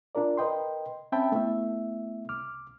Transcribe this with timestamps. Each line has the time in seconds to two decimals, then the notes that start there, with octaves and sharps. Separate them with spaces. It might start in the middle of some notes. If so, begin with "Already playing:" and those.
0.15 D4 F4 A#4 D5
0.37 A#4 B4 D#5 G5 C6
1.12 C4 C#4 E5 G5 A5 B5
1.32 A3 B3 E4 E5
2.29 C2 D6 F6